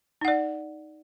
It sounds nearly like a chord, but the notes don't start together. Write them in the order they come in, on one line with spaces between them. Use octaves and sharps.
D#4 F#5 D5